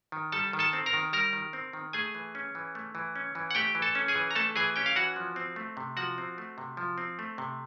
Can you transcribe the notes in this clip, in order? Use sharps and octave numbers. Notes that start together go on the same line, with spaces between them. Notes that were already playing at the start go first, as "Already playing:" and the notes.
D#3
G3 A4 A5
D#3
A4 A5
C4
A#4 A#5
D#3
G3 A#4 A#5
D#3
C4
D#3
A3 G#4 G#5
E3
C#4
E3
A3
E3
C#4
E3
F#5
A3 G4 G5
E3
A4 A5
C#4
G#4 G#5
E3
A#5
A3 A4 A5
E3 G#4 G#5
C#4 G4 G5
F5
E3 F#4 F#5
F3
C4
A3
C3
F3 F#4 F#5
C4
A3
C3
F3
C4
A3
C3